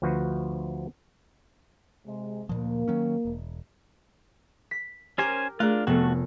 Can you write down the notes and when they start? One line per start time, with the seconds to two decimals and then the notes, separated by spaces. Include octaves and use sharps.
0.02 D2 F3 F#4 B4 C5
2.07 C3 G#3
2.49 D2 A#2 F3 A#3
2.88 D#3 F#3 C#4
3.25 E1
4.71 B6
5.18 C#4 G4 A#4 C5 G#5
5.60 A3 D4 F4 G#4 A#4
5.87 F1 A3 B3 F#4 A4